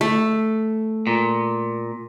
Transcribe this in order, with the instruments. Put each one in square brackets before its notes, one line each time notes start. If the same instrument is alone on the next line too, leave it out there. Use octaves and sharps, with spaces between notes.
[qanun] A3
[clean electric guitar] A#2